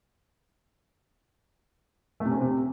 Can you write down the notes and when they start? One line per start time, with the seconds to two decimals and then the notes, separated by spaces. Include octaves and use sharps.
2.20 A3
2.26 C3
2.31 C#4
2.36 C4
2.41 C3